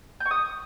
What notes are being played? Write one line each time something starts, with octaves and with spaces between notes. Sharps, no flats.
G6
C#6
D#6